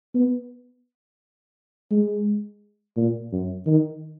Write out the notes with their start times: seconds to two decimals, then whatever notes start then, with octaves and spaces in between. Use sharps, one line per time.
0.15 B3
1.91 G#3
2.97 A#2
3.33 F#2
3.67 D#3